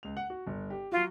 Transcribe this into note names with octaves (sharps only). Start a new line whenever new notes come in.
C#2 F7
F#5
F#4
G1
G4
F#3 F4 F#4